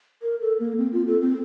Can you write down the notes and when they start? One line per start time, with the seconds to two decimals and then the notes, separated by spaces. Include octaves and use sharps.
0.22 A#4
0.41 A4
0.60 A#3
0.78 C4
0.93 F4
1.07 A4
1.22 C4